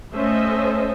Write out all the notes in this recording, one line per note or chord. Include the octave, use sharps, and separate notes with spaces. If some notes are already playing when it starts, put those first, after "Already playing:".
A3 C#4 A4 C5 D#5 E5